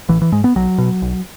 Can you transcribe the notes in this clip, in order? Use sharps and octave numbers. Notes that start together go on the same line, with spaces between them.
A1 E3
E3
G#2 G#3
B3
B1 F#3
B2
B1